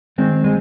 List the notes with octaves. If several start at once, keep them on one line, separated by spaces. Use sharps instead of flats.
D#3 G#3 C4
G#3